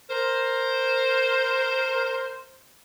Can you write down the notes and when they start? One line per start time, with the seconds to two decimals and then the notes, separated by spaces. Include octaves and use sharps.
0.10 A#4 C5